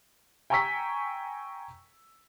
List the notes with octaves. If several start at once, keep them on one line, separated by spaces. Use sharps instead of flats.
G5 G#5 A#5 C#6 E6 B6